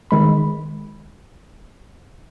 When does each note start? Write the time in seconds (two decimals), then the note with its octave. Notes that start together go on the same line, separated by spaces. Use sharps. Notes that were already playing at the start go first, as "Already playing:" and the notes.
0.11 D#3 G#3 B5